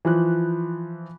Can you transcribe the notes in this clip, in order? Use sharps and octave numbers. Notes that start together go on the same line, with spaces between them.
E3 F3 F#6